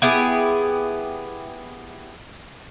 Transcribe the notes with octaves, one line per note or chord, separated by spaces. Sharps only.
B3 E4 G4 G#4